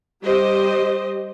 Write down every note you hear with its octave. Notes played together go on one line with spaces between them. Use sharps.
G3 G4 C5 D#5